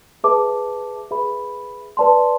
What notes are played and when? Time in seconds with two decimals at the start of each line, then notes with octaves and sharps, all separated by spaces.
0.24 G#4 B4 E5 A5 D6
1.11 G#4 B4 E5 B5
1.97 B4 D5 A5 C6